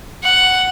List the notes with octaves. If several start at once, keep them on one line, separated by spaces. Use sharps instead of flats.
F#5